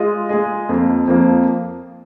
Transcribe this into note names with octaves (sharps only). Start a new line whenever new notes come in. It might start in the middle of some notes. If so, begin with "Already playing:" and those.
Already playing: G#3 F4 G#4 D#5
G#3 F4 G#4 D#5
F2 F3 A#3
F2 F3 A#3